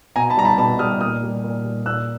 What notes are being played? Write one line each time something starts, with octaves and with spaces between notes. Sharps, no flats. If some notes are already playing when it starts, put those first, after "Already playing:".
B2 G#5 A#5
A5 B5
G3 A#5
A5 B5
B2 A5 B5
G3 D#6 F6
A#2 D#6 F6
G3
A#2
G3
A#2 E6 F#6